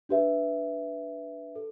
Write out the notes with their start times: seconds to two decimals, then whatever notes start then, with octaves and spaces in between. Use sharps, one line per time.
0.09 D4 G4 B4 E5
1.56 A4